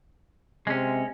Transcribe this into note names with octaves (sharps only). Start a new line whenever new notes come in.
C3 G#3 C#4